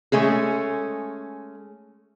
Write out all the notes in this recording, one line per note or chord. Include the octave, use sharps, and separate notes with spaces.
G#3 A3 C#4 G#4